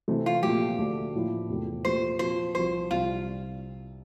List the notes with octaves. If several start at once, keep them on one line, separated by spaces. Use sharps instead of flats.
C3 E3 A3 C4
F4
A#2 F3 A3 G4
D2 D3 A3 D4
A2 F3 A#3 E4
E2 C3 F3 A3
A#2 F3 A3 C4 G4 C5
A#2 F3 C4 C5
C2 C3 F3 C5
C2 C3 G3 C4 F4